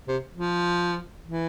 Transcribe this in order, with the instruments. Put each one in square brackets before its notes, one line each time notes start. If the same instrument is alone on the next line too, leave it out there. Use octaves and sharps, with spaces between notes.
[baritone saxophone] C3
F3
E3